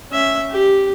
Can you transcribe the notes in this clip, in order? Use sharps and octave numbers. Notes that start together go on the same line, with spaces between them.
C#4 E5
G4